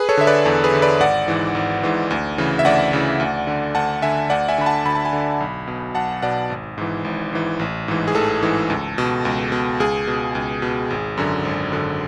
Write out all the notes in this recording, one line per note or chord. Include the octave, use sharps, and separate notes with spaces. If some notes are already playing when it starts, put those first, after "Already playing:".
Already playing: G#4 B4
A4 C#5
D3 E5
B4 D5
E2 A4
G#4 B4
D3
B4 D5
G#1 D5 F#5
G#2 E3
G#1
G#2 E3
D2
C#3 E3
E5
D2 D5 F#5
C#3 E3
D2
D3
D2 F#5 A5
D3 E5 G#5
D2 D5 F#5
E5 G#5
D3 B5
F#5 A5
D2 B5
A5
G#5 B5
D3
B1
B2
B1 F#5 A5
B2 D5 F#5
G#1
G#2 E3
G#1
G#2 E3
A1
G#2 E3
G#4
A1 A4
G#2 E3
C#2
B2
C#2
B2
C#2 G#4
B2
C#2
B2
G#1
F#2 D3
G#1
F#2 D3